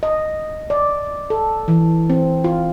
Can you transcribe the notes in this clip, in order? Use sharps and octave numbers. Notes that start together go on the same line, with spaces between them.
D#5
D5
A4
E3
C4
F4